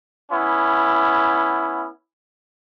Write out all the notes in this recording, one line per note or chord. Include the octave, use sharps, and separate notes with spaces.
B3 C#4 E4